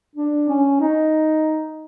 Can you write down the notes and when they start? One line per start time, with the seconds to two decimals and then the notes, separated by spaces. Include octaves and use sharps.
0.16 D4
0.48 C#4
0.80 D#4